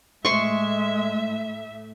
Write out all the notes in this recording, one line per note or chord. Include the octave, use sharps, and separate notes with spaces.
A2 G#3 A3 E5 C6 C#6